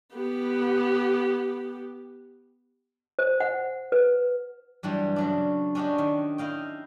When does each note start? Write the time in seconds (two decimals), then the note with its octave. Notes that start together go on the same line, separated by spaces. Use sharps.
0.15 B3 G4
3.19 C5
3.40 F#5
3.92 B4
4.83 G2 E3 F#3 G3
5.16 C#3 F#3 D4
5.75 C#4 D4 F#4 G4 D#5
5.98 D#3
6.38 E4 D#5 F5 G5